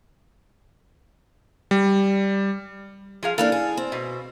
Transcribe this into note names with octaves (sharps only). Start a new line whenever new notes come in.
G3
F3 G#4 F5
E3 A#3 D4 A4 F5
G#4
C4
B2